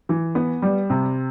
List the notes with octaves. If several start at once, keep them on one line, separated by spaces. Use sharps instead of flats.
E3
B3
G3
C3